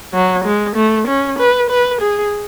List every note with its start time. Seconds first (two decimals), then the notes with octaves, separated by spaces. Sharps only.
0.14 F#3
0.45 G#3
0.76 A3
1.07 C#4
1.39 B4
1.70 B4
2.01 G#4